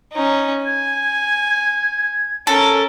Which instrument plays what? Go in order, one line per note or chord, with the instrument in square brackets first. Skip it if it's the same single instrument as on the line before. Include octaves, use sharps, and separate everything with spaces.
[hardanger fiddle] C#4 D#4
[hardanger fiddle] G#5 [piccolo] G#6
[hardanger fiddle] C#4 A#4 [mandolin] A4